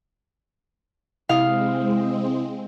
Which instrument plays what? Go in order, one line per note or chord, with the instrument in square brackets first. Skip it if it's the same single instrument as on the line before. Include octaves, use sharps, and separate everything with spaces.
[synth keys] C3 E4 D#6 [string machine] G#3 C4 [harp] F5